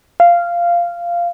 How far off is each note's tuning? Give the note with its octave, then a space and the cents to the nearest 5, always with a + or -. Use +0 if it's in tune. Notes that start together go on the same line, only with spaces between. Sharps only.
F5 -10